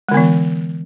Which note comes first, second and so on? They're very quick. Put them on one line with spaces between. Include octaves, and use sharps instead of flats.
G#3 D3 B3 E3